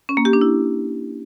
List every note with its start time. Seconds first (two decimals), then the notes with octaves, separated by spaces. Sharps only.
0.09 C#4
0.17 A#3
0.25 G4
0.33 D4
0.41 E4